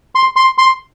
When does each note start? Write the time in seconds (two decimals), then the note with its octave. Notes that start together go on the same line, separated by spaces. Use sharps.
0.15 C6
0.36 C6
0.58 C6